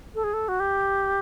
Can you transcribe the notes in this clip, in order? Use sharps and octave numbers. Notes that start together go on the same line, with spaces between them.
A4
G#4
A4
F#4
G4